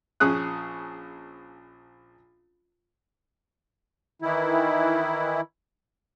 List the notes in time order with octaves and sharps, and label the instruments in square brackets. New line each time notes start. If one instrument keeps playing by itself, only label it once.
[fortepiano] A#1 C#4 G#4 D#6 F#6
[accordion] D#3 E3 E4